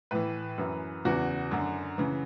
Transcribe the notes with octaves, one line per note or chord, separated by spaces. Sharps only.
A2 E3 B4
F#2 E3
E2 C#3 E3 F#4
F#2 D3
C#3 E3